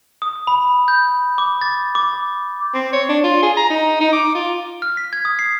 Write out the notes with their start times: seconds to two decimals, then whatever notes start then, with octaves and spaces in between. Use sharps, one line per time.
0.22 D#6
0.47 B5
0.88 G6
1.38 D6
1.61 A6
1.95 D6
2.74 C4
2.93 C#5
3.09 D4
3.24 F4
3.42 G#4
3.57 A#5
3.70 D#4
4.00 D#4
4.13 D6
4.35 F4
4.82 F6
4.97 B6
5.13 G#6
5.25 D#6
5.39 C7